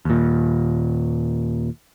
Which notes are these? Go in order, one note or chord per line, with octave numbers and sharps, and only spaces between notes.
D#2 A#2